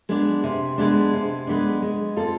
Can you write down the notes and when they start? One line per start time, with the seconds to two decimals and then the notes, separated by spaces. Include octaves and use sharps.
0.09 G#3 B3 D4
0.44 C3
0.78 G#3 B3 D4
1.13 C3
1.47 G#3 B3 D4
1.82 G#3
2.16 C4 F4 A4